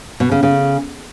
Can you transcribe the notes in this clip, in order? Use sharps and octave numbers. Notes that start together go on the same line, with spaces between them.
B2
C#3
C#3